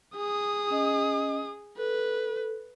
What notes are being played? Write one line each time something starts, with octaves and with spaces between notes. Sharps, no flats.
G#4 D#6
C#4 D#5
A4 B4